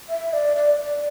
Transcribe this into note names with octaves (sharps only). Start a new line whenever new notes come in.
E5
D5
D5
D5